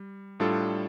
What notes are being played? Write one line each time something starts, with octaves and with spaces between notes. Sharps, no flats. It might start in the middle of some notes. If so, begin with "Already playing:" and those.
Already playing: G3
A2 G3 D4 F4 A4